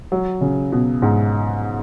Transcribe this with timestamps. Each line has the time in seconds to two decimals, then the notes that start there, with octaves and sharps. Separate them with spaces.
0.12 F#3
0.41 C#3
0.72 B2
1.02 G#2